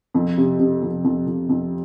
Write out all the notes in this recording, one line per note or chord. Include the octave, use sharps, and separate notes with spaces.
F2
C3
C3
F2
F2
F2
F2